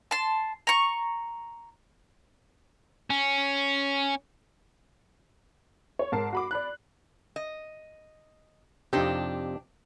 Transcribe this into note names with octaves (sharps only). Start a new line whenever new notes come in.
A5 C6
A#5 C#6
C#4
C#5
G#2 A#4 A5 C7
F#4 B5 D6
D5 B5 F#6
D#5
F2 C3 D4 D#4 G4